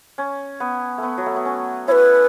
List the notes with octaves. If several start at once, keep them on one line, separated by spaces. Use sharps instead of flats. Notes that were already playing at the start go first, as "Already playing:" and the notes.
C#4
B3
A3 B3
F#3
A3
B3
C#4
E4 B4 C#5